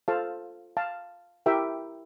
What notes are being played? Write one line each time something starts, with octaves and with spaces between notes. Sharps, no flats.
F4 A4 C5 F5 A5
F5 A5
E4 G4 A#4 E5 G5